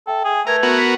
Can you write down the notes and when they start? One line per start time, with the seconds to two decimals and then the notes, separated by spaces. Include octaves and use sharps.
0.07 A4 E5 G5
0.25 G#4
0.47 A3 A#4 B4 G#6 F7
0.63 B3 F#4 A#4
0.78 B6